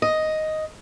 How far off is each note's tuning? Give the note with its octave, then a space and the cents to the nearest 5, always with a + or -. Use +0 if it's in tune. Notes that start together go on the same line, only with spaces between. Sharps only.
D#5 +5